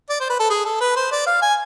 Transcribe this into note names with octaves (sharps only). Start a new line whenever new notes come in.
D5
C5
B4
A4
G#4
A4
B4
C5
D5
F5
G#5